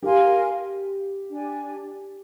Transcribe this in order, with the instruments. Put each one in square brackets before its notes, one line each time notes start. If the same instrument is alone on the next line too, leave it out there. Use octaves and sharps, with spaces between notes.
[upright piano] G4 [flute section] A#4 F5 G#5 C6
[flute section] D4 G4 D5 G#5